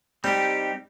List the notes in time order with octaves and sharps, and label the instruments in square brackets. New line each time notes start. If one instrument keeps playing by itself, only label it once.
[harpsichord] G3 [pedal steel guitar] C4 D#4 G4